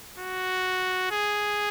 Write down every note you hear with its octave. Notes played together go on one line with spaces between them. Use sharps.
F#4
G#4